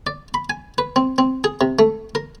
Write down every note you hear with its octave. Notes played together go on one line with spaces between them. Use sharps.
D5
B5
G#5
B4
C4
C4
G#4
C3
A3
A#4